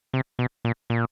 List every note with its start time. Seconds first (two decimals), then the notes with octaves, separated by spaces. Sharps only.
0.13 C3
0.39 B2
0.65 A#2
0.90 A#2